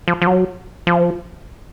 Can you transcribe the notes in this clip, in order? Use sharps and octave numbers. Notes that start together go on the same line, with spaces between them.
F3
F3
F#3
F3